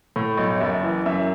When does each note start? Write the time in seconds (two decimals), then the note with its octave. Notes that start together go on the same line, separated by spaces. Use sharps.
0.16 A2
0.37 B1
0.60 F#1 E5
0.83 E3
1.06 F#2 E5